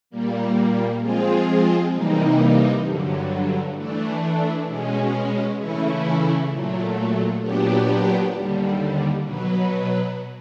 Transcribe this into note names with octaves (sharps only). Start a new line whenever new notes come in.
A#2 G3 A#3
F3 G#3 C4 F4 G#4
C3 E3 G3 A#3 D#4
G2 D3 F#3
E3 A3 D4
B2 G#3 C#4
C#3 E3 A3 C#4 E4
A#2 F#3 A3
A#2 F#3 B3 D4 G4
D#2 D3 G3
B2 F#3 B3